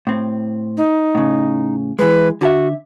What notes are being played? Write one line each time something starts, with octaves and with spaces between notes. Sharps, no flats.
A2 C4
D#4
A2 C#3
E3 G#3 B4
D3 F#4 A4 E5